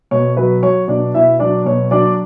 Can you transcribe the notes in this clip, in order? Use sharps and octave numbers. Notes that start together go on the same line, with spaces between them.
B2 C#5
F#3 B4
F#3 C#5
B2 D4 D5
B2 E4 E5
F#3 D4 D5
B2 C#5
F#3 D4 D5